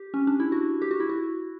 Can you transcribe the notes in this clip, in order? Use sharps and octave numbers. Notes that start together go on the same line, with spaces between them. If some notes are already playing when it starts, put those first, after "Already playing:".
Already playing: G4
C#4
D4
E4
F#4
G4
F#4
E4
F#4